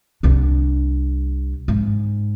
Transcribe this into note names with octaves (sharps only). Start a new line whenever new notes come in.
C2 D4
G#2